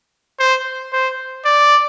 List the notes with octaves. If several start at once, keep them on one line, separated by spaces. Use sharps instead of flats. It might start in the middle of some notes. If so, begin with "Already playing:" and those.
C5
C5
D5